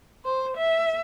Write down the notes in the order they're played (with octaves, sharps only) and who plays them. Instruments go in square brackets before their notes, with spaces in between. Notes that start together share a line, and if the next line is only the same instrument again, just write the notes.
[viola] C5
E5